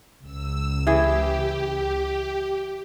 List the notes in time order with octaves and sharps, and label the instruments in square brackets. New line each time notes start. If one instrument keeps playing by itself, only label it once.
[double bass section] C#2 [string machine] E6
[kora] E3 G#4 [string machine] G4